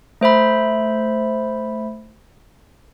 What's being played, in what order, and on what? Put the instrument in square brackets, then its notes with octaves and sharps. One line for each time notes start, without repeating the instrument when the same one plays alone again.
[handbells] A3 C5 E5 B5